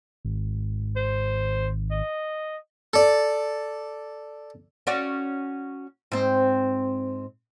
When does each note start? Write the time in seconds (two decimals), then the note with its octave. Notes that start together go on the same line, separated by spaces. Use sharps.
0.25 G#1
0.96 C5
1.91 D#5
2.93 A4 D5
4.87 C#4 F#4 D5
6.12 G#2 C4